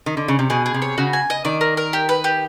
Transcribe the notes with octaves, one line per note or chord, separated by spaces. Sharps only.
D#3
D3
C#3
C3
B2 G#4
G#4
C3
C#5
C#3 F#4
G#5
D#5
D#3 D5
A#4
A#4
G4
B4
G4